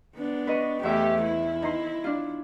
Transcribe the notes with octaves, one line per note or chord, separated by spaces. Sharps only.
B3 D4
B4 D#5 C#6
E2 A3 G4 E5
E4
D#4 C6
D4 F4